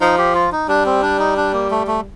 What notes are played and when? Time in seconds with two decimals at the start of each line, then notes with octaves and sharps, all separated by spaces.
0.01 F3 D#4
0.18 G4
0.35 F4
0.52 D#4
0.68 G3 D4
0.86 C4
1.02 D4
1.19 D#4
1.37 D4
1.53 A#3
1.71 A3
1.87 A3